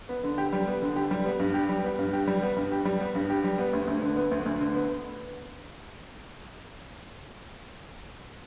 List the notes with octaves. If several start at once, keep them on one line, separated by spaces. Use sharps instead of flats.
B3
D3
G4
G3
B3
D3
G4
G3
B3
G2
G4
G3
B3
G2
G4
G3
B3
G2
G4
G3
B3
G2
G4
G3
B3
D2
D2
D3
B3
D2
D2
D3
B3